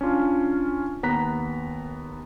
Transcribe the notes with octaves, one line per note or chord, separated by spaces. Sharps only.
C#4 D4 F4
D#2 B3 A#5 F#6 B6